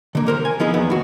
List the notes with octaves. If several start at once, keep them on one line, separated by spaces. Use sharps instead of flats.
D3 A#3
C2 A#4 C5
G#5
F3 B3 D#4 E4 G#4
E2 B3
D#2 F#4